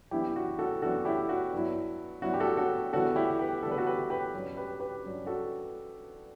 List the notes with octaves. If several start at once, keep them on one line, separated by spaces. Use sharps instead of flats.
F#2 E3 B3 D4 E4 G4
F#4
F#4 A4
F#2 E3 B3 D4 F#4 A4
E4 G4
F#4
G2 F#3 B3 E4
G2 F#3 B3 E4 F#4
G4
F#4 A4
F#4 A4
E2 D3 G3 B3 E4 F#4 A4
E4 G4
G4 B4
E2 D3 G3 B3 E4 A4
B4
F#4 A4
G4 B4
G4 B4
G2 F#3 C#4
G4 B4
G4 B4
G2 F#3 C#4
F#4 A4